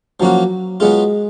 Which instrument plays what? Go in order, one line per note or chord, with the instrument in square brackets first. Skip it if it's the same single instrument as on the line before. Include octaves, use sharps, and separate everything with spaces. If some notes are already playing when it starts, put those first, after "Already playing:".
[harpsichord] F3 A#3 C#4 F#4 [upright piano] F#3
[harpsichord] F#3 B3 F4 [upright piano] G#3